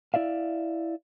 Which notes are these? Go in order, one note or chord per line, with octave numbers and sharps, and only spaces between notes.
E4 D5 E5 F5